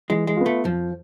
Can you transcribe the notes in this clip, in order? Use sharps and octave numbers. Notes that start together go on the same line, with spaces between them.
E3 G#3
G#3
B3 F4
A3
F2 F3